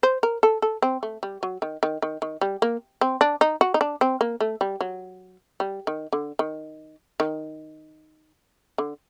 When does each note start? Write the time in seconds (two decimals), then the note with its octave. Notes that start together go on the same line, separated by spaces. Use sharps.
0.03 C5
0.23 A#4
0.43 A4
0.62 A4
0.82 C4
1.03 A3
1.23 G3
1.43 F#3
1.62 D#3
1.83 D#3
2.02 D#3
2.22 D#3
2.41 G3
2.62 A#3
3.01 C4
3.21 D4
3.41 D#4
3.61 F#4
3.74 D#4
3.81 D4
4.01 C4
4.21 A#3
4.41 A3
4.61 G3
4.81 F#3
5.60 G3
5.87 D#3
6.13 D3
6.39 D#3
7.20 D#3
8.78 D3